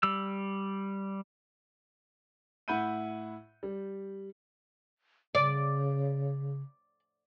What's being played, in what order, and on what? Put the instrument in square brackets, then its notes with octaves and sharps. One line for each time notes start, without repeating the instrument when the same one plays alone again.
[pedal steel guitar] G3 E6
[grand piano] A2 E4 F#5 B5 G6 D#7
G3
[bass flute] C#3 [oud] D5